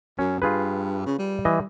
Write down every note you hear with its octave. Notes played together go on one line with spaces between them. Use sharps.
F#2 C#4
G2 F4 G#4 B4
C#3
G3
E3 D#5